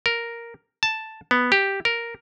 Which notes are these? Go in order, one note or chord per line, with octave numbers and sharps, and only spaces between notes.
A#4
A5
B3
G4
A#4